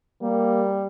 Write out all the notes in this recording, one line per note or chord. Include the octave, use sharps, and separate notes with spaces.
G3 A#3